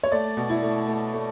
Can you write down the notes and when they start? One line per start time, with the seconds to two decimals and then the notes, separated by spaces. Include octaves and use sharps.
0.03 C#5
0.12 A3 D5
0.37 B2
0.50 E4
0.63 A3
0.88 A3
1.14 A3